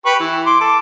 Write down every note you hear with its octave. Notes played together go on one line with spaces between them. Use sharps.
G4 B4 C#6
E3
C6 D6
A4 D6